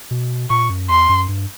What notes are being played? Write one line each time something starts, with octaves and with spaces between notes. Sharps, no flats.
B2
A#2 C#6
F#2
E2 C6
F#2
G2